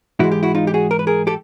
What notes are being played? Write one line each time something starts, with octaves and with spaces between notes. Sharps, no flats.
G#2 E3 G#3 E4 F#4
G4
E4 F#4
D#4 F4
G4
F#4 G#4
A#4
B4
G#4 A#4
G4 A4